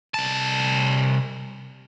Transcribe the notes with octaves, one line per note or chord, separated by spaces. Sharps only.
C2 A5